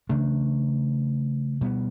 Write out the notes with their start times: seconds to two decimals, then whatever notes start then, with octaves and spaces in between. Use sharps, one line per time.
0.09 C#3 E3 A3 D4
1.61 B2 G3 B3